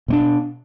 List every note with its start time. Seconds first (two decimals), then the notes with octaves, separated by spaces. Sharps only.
0.08 B2 A3 D4